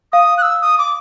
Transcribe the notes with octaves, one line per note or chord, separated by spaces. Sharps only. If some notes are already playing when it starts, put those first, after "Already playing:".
F5 D#6
F#6
E6
D#6
D6